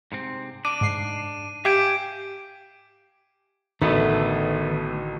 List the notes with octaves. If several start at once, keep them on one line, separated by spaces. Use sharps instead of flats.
G#2 C3 C4
D4 D6 D#7
G#2 C7
G4 E5 F5 G#5 D6 G6 D7
A1 D3 D#3 A3 B3 F#4